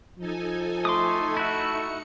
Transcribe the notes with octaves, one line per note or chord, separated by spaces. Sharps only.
F3 D#4 A4 G#5
A3 C6 D6 D#6
D#4 E4 F#4 C#7